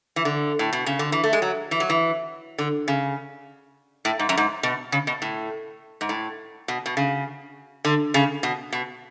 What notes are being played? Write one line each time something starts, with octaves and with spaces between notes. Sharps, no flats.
E3
D3
A2
B2
C#3
D3
E3
A3
G#3
F#3
E3
F#3
E3
D3
C#3
A2
G#2
F#2
G#2
B2
C#3
B2
A2
G#2
A2
B2
B2
C#3
D3
C#3
B2
B2